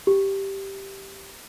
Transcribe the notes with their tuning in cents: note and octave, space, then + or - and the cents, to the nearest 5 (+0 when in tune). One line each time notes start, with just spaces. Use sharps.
G4 -5